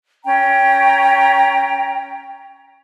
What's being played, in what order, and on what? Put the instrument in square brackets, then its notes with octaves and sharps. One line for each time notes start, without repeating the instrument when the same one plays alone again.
[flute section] C#4 G5 A#5